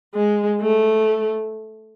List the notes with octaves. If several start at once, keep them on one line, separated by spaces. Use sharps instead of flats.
G#3
A3